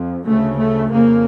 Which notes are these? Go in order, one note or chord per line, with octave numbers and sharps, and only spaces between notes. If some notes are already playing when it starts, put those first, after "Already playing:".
Already playing: F2
D2 C#3 A3
A3
F2 C#3 A#3